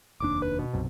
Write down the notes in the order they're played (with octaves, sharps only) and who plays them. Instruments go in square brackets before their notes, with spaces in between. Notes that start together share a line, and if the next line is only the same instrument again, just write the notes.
[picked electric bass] F1 D#2 D4 [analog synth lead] D6
[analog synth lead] B4
B2
[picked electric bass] B1 F#2 C3